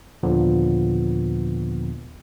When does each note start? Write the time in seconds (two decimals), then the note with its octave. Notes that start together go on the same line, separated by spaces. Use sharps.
0.23 D#2 A#2 D3 F3 B3